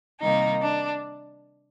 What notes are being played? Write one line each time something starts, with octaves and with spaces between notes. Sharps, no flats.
C3 D#3 G3 A#3 D#4
D4